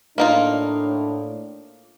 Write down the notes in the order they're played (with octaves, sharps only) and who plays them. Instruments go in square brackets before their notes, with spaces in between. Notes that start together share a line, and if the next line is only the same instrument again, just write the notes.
[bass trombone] A2 [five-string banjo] A#3 D#4 F4 [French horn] D4